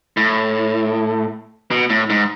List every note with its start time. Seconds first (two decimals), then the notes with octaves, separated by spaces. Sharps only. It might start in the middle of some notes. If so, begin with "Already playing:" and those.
0.17 A2
1.71 B2
1.90 A2
2.10 G#2